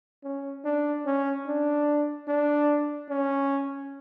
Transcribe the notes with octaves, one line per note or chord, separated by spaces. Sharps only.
C#4
D4
C#4
D4
D4
C#4